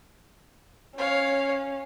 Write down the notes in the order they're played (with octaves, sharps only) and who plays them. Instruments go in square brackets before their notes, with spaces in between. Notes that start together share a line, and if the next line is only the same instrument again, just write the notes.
[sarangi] C#4 [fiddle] C#5 F5